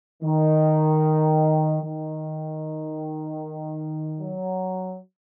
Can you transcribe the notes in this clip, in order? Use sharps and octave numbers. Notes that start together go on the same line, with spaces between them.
D#3
D#3
F#3